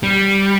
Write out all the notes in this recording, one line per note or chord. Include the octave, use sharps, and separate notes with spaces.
G3